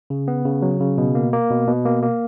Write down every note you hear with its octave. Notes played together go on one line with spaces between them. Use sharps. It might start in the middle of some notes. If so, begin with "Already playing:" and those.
C#3
B3
C#3
F#3
C#3
B2
A#3
A#3
B2
B2
A#3
A#3